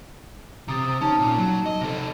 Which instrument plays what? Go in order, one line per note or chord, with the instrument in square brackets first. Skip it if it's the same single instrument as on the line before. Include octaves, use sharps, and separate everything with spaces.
[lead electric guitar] C3 [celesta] A#5 D#6 A6
[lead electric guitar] C#4 [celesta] D#4 A5
[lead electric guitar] A#2
F#3
D#5
C3 A4